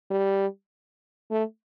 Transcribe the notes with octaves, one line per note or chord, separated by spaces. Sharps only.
G3
A3